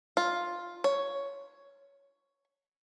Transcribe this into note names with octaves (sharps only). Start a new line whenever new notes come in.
F4
C#5